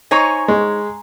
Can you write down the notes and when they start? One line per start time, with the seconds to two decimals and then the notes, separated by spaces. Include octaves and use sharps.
0.11 D#4 C5 C#5 G#5 A#5 C#6
0.48 G#3